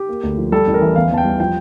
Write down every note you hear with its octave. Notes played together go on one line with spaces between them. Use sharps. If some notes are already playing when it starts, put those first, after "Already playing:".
Already playing: G4
A#3
D2
F3
G3 A4
A1
A#4
E3
E2 F5
E2 A5
G5
G3
F3 G5